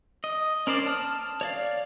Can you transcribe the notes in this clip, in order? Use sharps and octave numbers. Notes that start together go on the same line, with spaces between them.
D#5
C#4 A#4 C5 D5
A5 D#6 F6
C#5 D5 F5